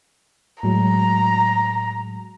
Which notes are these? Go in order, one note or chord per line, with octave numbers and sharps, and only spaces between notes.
A2 F#3 G#3 A#5